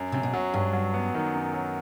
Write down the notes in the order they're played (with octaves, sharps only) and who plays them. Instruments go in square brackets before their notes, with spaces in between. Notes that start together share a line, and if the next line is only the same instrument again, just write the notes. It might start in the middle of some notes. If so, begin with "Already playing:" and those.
Already playing: [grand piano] F#2
[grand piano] F#2 [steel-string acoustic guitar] C3
[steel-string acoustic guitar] B2
[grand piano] F#3
[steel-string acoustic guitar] G2 [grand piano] F#3
[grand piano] F#3
B3
D#3
F#2
F#3